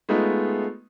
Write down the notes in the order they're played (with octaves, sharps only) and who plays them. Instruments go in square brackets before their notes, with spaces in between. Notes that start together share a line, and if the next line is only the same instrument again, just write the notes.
[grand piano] G#3 A3 B3 D#4 F4